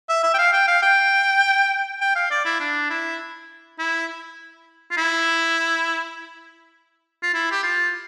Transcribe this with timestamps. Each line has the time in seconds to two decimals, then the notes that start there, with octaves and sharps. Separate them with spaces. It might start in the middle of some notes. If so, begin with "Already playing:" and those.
0.09 E5
0.23 E5
0.34 G5
0.38 F5
0.53 G5
0.67 F5
0.82 G5
2.01 G5
2.16 F5
2.31 D5
2.45 E4
2.60 D4
2.90 E4
3.79 E4
4.91 F4
4.97 E4
7.23 F4
7.34 E4
7.52 G4
7.63 F4